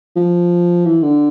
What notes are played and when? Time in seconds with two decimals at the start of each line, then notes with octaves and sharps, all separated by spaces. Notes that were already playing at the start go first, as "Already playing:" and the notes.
0.16 F3
0.86 E3
1.03 D3